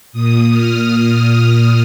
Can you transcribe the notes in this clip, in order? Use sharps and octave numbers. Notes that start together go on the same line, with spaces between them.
A#2 D#6
F6